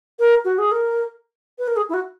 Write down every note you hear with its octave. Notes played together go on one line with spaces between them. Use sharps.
A#4
F#4
G#4
A#4
B4
A#4
G#4
E4
F#4